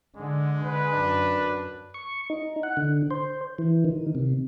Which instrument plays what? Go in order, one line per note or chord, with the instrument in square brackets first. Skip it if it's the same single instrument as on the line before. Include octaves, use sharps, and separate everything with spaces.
[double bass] D3 [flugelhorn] G#3
[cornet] B4
[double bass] F#2 [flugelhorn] D4
[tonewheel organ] C#6
D#4
F#5
D3
C5
E3
D#3
C3